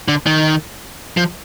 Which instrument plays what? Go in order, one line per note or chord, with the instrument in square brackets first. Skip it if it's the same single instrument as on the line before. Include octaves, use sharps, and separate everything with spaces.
[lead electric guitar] D3
D#3
F3